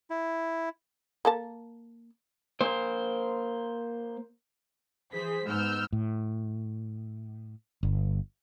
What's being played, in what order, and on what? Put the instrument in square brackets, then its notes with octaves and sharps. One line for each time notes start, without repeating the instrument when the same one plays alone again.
[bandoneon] E4
[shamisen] A#3 A4 A5
[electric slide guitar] A#3 C5
[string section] E3 G#4 C5 B6
G#2 G#3 B3 E6 F6 G6
[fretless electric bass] A2
G1